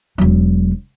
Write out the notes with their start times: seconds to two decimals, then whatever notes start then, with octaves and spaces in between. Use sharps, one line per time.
0.18 E1 F#3